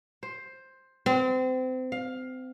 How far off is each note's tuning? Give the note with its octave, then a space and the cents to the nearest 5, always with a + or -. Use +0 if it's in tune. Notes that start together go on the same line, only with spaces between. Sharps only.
C5 +10
C4 -30
F5 +15